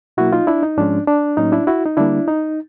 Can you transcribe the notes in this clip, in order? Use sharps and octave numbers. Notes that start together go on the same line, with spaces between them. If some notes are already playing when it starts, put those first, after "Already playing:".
B2 F#3 A#3 E4 F#4
D#4 F4
D4 E4
D#4
G#2 F3 G#3 C#4 D4
D4
A2 F#3 A#3 C#4 D#4
D4 E4
E4 F#4
D#4
D3 G3 A#3 D4 E4
D#4